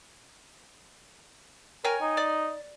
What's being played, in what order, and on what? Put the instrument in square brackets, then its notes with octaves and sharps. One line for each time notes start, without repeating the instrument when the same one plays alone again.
[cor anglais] A#4 [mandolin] C#5 G5 G#5
[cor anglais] D#4
[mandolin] D5